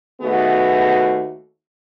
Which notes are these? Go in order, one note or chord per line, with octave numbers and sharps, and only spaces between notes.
D#2 A3 B3 F#4 G#4